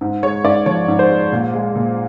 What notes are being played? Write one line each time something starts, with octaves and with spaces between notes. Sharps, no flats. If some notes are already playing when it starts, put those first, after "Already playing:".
G#2
G#3 C#5
G#2 D5
F3 C#5
G#2
C5
G#3
A#2
G#3
A#2